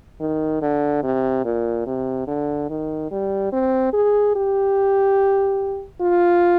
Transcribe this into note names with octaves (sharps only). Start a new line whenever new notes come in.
D#3
D3
C3
A#2
C3
D3
D#3
G3
C4
G#4
G4
F4